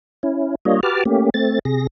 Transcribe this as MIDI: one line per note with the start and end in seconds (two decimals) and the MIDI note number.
0.23 0.55 61
0.23 0.55 64
0.65 0.80 55
0.65 0.80 58
0.65 0.80 62
0.65 0.80 65
0.65 0.80 73
0.65 0.80 75
0.83 1.04 66
0.83 1.04 67
0.83 1.04 71
0.83 1.04 81
0.83 1.04 86
0.83 1.04 89
1.05 1.30 57
1.05 1.30 58
1.05 1.30 61
1.05 1.30 67
1.34 1.59 57
1.34 1.59 60
1.34 1.59 93
1.65 1.87 48
1.65 1.87 68
1.65 1.87 94